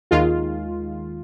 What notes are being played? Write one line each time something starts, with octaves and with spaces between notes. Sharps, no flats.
D#2 D#3 G#3 F4